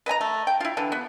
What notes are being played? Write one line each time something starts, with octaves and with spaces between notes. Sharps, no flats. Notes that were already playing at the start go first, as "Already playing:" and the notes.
B4 D#5 G#5 A#5
A3
G5
E4 F4
D3 E3
B3